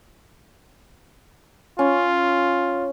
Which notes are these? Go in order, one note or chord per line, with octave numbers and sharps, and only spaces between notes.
C#4 F4